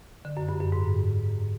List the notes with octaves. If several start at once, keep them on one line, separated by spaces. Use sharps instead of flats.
D3
F#2
G2
F#2
G#2